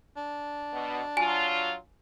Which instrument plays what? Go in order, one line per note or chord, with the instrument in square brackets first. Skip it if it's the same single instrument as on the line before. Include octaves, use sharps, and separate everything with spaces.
[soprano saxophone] D4
[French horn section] B2
[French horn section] F#3 F4 [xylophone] G#5